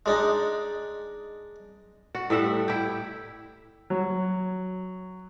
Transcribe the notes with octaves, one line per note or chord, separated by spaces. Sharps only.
G#3 D4 D#4
F#4
A2 G3 E5 F#5
E4 G4
F#3